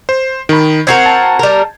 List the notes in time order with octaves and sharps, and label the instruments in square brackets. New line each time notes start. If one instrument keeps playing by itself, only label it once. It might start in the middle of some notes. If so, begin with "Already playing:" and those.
[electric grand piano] C5
D#3 B5
[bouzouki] C4 F#4 A#4 [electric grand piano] G6 G#6 C7
[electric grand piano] A5
[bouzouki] G3 A#4